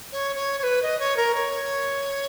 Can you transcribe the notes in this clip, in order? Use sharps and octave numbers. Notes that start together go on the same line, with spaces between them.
C#5
C#5
C#5
B4
D#5
C#5
A#4
C#5